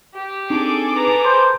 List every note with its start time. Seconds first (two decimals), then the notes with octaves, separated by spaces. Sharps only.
0.15 G4
0.50 C4 D4 D#4 G#4 A4 D6
0.93 B4 A#5
1.25 C5 A5 B5 C6